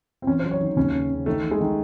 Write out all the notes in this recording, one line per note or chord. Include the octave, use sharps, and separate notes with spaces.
C4
E2 C#4
C5
F#3
C#5
D#3
D#2 C#4
C#3
C#3
D#3 A3
D#3
G#3
D#3